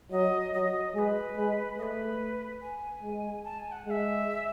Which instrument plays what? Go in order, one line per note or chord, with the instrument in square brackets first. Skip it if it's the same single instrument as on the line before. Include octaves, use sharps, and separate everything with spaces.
[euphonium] F#3 [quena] D#5
[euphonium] F#3 [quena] D#5
[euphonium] G#3 [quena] D#5
[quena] B4
[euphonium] G#3
[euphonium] A3 [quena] D#5
[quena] B4
G#5
[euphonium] G#3
[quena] A5
G#5
F#5
[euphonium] G#3 [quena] E5 F#5